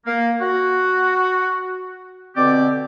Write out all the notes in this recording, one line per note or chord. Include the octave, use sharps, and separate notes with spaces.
A#3
F#4
B2 D3 C4 G4 D5